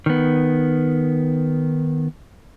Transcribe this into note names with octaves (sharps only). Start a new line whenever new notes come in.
D#3 B3